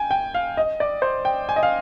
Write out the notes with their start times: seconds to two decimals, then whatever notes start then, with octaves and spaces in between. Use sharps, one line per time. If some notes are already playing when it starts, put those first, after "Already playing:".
Already playing: G5 G#5
0.11 G5
0.34 F5
0.57 D#5
0.80 D5
1.02 C5
1.25 G5
1.49 G#5
1.56 D#5
1.63 F5